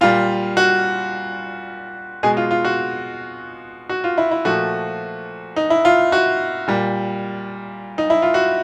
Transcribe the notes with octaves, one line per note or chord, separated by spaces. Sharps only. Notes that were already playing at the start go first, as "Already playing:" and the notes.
A#2 G3 F4
F#4
B2 G#3 G#4
F4
F4
F#4
F#4
F4
E4
E4
A#2 F3 A3 F#4
D#4
E4
F4
F#4
A#2 G3
D#4
E4
F4
F#4